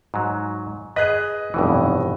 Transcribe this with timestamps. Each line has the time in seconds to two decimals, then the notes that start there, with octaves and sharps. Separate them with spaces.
0.14 G#2 F#3
0.96 G#4 B4 D#5 F#6
1.54 F1 G2 B2 E3